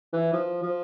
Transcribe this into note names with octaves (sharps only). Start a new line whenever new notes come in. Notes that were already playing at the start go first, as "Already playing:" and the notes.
E3
F3
F3